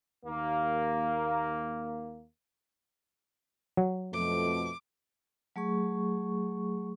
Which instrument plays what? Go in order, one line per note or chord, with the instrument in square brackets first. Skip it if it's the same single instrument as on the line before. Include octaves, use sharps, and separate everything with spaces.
[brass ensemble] D#2 A#3
[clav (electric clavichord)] F#3
[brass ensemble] F2 B2 A3 [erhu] D6
[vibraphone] F#3 A3 G#4 C#6